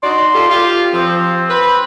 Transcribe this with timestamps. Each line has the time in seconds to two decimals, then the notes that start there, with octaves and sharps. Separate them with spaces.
0.03 D#4 F#4 D5 C6
0.34 F4 G4 A4
0.49 F4 G4
0.93 F3 C4
1.49 B4